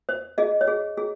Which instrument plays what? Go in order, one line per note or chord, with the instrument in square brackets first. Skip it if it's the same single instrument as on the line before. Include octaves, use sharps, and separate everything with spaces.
[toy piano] C5
G#4 D#5
C#5
G#4
G#4